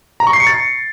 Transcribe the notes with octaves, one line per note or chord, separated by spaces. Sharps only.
A#5
C#6
C7
C#7
A6